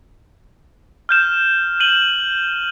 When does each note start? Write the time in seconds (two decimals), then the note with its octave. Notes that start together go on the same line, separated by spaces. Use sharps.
1.09 F6 G6 E7
1.80 D#7 F#7 G7